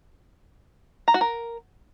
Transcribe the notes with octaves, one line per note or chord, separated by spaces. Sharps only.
A#5
F#4
A#4